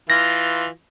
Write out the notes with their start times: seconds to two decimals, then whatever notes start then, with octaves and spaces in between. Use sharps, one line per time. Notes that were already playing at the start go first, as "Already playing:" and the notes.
0.10 E3 F4 A#6